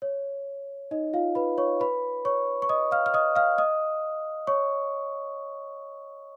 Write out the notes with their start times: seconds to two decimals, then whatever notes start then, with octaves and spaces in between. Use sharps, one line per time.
0.02 C#5
0.91 D#4 D#5
1.13 F4 F5
1.35 B4 B5
1.58 C#5 C#6
1.80 B4 B5
2.25 C#5 C#6
2.62 C#6
2.69 D#5 D#6
2.91 F5 F6
3.06 F6
3.14 D#5 D#6
3.36 F5 F6
3.58 D#5 D#6
4.47 C#5 C#6